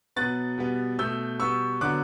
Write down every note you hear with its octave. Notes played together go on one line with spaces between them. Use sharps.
B2 F#3 B3 F#6 A6
B2 G3 B3
B2 A3 E6 G6
B2 G3 B3 C#6 E6
D3 F#3 B3 D6 F#6